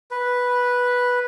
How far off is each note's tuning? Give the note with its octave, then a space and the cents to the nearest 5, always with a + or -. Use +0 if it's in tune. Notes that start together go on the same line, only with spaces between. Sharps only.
B4 -5